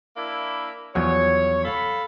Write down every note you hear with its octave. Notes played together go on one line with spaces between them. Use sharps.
A#3 D4 E4
E2 F3 F#3 C#5
A4 F5 B5